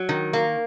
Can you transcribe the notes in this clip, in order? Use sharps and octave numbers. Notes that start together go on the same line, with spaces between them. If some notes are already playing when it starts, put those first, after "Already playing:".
Already playing: F#3
D#3
A#3